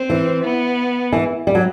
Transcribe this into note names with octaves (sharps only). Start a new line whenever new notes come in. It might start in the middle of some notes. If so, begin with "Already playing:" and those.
Already playing: C4
E3
B3
E3
G3
F#3